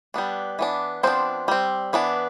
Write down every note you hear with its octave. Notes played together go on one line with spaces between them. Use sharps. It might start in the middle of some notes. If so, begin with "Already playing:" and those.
G3 B3 D4
E3 B3 D4
F3 B3 C4 D4 C5
G3 C4
E3 B3 D4